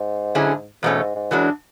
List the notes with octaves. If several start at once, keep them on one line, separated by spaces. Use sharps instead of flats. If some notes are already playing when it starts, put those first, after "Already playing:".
Already playing: G#2
D3 F#3 C#4 E4 G#4
E2 G#2 B2 A3 C#4
G#2
G#2
F#2 E3 G#3 D4 F#4